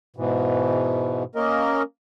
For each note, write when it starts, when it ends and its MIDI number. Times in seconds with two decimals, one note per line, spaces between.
0.16 1.23 44
0.16 1.23 47
0.16 1.23 52
1.35 1.82 58
1.35 1.82 61
1.35 1.82 70
1.35 1.82 75